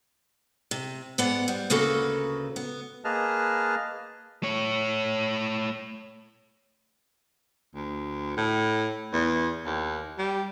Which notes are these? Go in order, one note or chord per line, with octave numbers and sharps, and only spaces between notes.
C3
G#2 B3 D5 F#5
G3
D2 C#3 A#3 F#4 A4 B4
B3
A#3 G#4 B4 D#5 A5 F6
A3 C#5
D2
A2
E2
D#2
G3